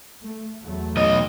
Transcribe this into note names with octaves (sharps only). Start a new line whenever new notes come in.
A3
E2 F#3 A3
B1 D#5